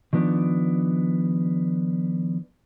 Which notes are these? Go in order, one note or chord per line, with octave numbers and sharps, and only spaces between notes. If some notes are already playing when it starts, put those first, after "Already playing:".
D#3 F3 B3 D4